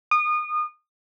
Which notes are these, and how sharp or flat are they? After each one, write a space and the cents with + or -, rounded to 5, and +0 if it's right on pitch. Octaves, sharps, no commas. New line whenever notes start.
D#6 -30